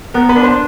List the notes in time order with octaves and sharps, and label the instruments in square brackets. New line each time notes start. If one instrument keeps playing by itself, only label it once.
[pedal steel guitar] B3 [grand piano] A#4
[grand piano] B4
[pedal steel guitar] D4
[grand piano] C5